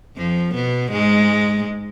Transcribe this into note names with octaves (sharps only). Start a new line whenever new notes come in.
F2 F3
B2 B3
G#2 G#3